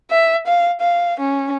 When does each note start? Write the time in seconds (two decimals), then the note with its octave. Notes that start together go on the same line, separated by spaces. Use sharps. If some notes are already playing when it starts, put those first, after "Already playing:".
0.11 E5
0.47 F5
0.81 F5
1.20 C#4